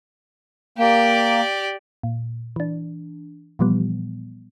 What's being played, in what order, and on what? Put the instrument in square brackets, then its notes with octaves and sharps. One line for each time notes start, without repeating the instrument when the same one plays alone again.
[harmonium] A#3 [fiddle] G4 D5
[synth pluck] A#2
E3 D4
A#2 E3 F3 G3 B3